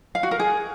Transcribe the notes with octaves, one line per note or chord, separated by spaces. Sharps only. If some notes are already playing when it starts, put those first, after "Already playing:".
F5
F#4
A#4
G#4